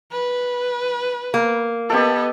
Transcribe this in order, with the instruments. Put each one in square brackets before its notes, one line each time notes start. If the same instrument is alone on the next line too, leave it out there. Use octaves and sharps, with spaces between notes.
[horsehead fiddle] B4
[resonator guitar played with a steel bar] A#3
[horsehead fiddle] B3 D#5 [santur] G4 A4